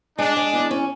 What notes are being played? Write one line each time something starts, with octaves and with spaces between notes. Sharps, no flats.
G#3 D4
G#3
E2
C#4